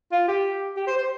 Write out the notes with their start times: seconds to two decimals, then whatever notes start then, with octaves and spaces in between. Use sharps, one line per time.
0.12 F4
0.28 G4
0.76 G4
0.87 C5
0.98 C5